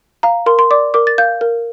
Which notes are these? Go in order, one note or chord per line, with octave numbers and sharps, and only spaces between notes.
F5 A#5
A#4 C6
C6
D5 D6
A#4 D6
A6
F5 G6
A#4